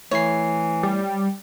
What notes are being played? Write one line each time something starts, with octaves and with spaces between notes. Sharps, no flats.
E3 A3 E4 C#5 C7
G3